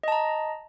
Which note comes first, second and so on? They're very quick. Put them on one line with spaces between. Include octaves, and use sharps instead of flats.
D#5 A5 A#5